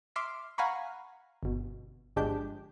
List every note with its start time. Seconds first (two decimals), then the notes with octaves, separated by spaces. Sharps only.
0.16 E5 C6 D6 F6 B6 C7
0.58 F5 F#5 G#5 A#5 B5 C#6
1.43 G1 B2
2.16 G1 F3 G#3 D4 G4 G6